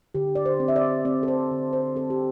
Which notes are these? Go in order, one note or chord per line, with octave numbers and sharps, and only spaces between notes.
D3 G4
D5
C5
C4
E5
D5
C4 D5
A4
C5
D3
C5
C4 A4
G4